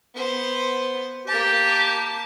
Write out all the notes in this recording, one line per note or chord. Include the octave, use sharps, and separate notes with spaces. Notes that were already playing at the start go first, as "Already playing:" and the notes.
B3 C5
A#3 G4 A5